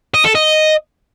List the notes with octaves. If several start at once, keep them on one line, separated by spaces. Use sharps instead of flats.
D#5
A4
D#5